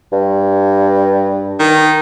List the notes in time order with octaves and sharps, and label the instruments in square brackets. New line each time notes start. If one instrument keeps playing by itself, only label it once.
[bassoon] G2
[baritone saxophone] D#3